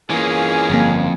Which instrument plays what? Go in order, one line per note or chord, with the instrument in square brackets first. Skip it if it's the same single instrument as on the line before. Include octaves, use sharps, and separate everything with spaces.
[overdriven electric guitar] E3 A#3 [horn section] C#4 F4 G#4
[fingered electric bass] G1 A#3 [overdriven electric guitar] F2